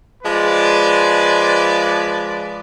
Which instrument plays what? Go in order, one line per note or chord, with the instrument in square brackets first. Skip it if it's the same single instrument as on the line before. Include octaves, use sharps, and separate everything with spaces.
[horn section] F3 G#3 B4 D5